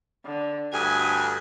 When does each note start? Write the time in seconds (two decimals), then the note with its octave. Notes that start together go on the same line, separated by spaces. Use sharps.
0.25 D3
0.73 D2 G2 G#5